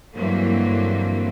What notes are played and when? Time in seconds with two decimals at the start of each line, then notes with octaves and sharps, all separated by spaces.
0.14 G2 D3 E3 F#3 A#3 C4